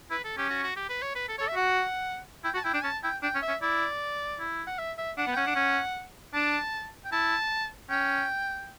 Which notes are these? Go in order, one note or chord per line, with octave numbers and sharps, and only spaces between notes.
E4 B4
A4
C#4 G4
F#4
F#4
G4
B4
C#5
B4
A4
C#5
A4
E5
F#4 F#5
E4 G5
F#4 A5
E4 G5
D4 G5
C#4 A5
E4 G5
D4 G5
C#4
E5
C#4
E4 D5
E4
F#5
E5
E5
D4 F#5
B3
G5
C#4 F#5
D4
C#4
D4 A5
G5
E4 A5
C#4 G5